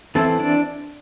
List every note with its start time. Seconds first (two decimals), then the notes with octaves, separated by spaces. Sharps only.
0.15 E3 C4 E4 A4
0.39 D4 D5